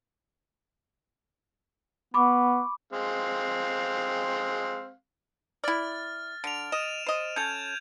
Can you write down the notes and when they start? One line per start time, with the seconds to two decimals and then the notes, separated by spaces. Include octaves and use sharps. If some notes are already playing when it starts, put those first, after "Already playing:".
2.14 B3 B5 C#6 D6
2.93 G#3 C4 F5
5.64 E4 D5 F6 A6
6.44 D3 D7 F7
6.72 D#5 D#7 E7
7.06 C5 D#5
7.36 C#4 A4 G6 G#6 F7